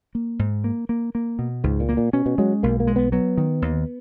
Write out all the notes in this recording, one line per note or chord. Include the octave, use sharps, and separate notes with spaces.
A#3
G#2
A#3
A#3
A#3
B2
C#2 G#2
A#2
A#3
A#2
B2 C#4
B2
F#3 G#3
B1 A#3
A#3
G#3
B3
F#3 B3
D#3
D#2